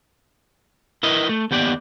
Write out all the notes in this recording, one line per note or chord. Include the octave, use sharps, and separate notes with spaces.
E4 A#4 B4 D#5
A3
D#2 B3 G4 B4 D5